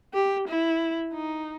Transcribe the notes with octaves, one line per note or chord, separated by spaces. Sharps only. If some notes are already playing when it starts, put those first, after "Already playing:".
G4
E4
D#4